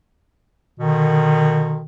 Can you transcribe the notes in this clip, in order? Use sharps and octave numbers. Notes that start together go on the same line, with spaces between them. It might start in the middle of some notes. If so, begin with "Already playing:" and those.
B2 D3 D#3